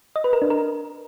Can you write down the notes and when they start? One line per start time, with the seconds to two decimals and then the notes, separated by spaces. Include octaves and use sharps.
0.16 D#5
0.24 B4
0.33 A#4
0.42 D4
0.50 A#4